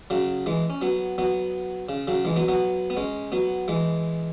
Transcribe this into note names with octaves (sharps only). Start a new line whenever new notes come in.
C#3 F#3
E3 G#3
C#4
F#3 B3
F#3 B3
C#3
C#3 F#3
E3 G#3
F#3 B3
F#3 B3
B3
G#3 C#4
F#3 B3
E3 G#3